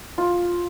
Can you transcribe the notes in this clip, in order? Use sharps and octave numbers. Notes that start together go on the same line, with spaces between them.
F4